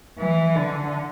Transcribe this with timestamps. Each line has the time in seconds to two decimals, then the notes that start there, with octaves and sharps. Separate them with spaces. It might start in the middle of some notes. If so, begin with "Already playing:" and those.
0.19 E3
0.55 D3